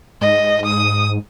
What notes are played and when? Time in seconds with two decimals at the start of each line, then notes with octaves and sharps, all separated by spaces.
0.21 G#2 D#5
0.66 D#6